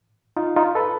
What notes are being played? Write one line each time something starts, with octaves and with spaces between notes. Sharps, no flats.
D#4 F4
D#4 F4
A4 B4